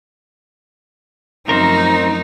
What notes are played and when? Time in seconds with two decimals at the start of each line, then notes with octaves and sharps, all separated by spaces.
1.49 F#2 F3 A3 C4 D#4 A#4